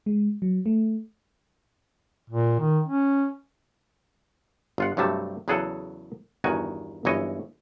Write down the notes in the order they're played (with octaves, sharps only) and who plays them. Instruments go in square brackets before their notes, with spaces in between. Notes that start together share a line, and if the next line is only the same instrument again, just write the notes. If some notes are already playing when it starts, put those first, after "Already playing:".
[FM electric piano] G#3
F#3
A3
[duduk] A#2
D#3
C#4
[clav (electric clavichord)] G1 F4 F#5
G2 C3 F#3 G3 A3 A5
E2 C#3 F#3 G#4 A4 F#5
G1 E2 D#3 F#4 G#5
G1 F#2 E3 C#5 D#5